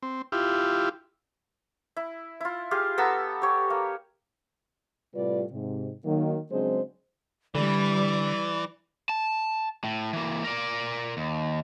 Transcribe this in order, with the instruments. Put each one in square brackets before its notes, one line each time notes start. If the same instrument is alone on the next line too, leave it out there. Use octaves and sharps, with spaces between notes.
[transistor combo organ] C4
E4 F4 G4
[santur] E4
E4 F4
F4 G4 G#4 F5
B3 A4 A#5 E6
G4 C#5
A#3
[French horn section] A2 C3 G3 F4 B4 D5
G#2 C3
D#3 F#3 A#3
C#3 F#3 G#3 C4 D4 C5
[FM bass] D3 [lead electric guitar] E3 [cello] G3 [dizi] D5
[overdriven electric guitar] A5
A2
E3 A#3
A#4 D5
D#2